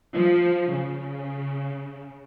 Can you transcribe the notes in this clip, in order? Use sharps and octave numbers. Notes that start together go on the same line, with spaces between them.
F3
C#3